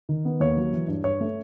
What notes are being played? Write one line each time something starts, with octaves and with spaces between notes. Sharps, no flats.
D#3
B3
D#2 C#5
F#3
E3
G2
G2 C#5
A3